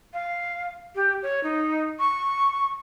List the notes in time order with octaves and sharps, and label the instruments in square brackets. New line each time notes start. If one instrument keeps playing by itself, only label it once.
[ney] F5
G4
C#5
D#4
C#6